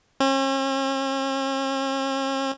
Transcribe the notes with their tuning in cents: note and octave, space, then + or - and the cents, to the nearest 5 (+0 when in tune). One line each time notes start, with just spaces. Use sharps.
C#4 -45